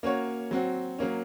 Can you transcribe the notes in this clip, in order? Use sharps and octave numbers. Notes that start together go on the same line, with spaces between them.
A#3 C#4 F#4 C#5
F#3 C4 F#4
F#3 A#3 C#4